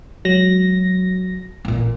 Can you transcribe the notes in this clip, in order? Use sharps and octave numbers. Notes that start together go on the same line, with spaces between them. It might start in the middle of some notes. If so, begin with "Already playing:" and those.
F#3 G#3 A#6
A1 A#2